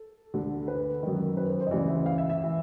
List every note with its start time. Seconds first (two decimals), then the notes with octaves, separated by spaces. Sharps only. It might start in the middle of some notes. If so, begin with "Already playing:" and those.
Already playing: A4
0.34 D2 D3
0.68 B4
1.03 F#2 D#3
1.37 B4
1.49 C5
1.61 C5
1.67 D#5
1.71 D2 C#3 E3 D5
1.88 E5
2.06 F5
2.18 E5
2.30 E5
2.44 E3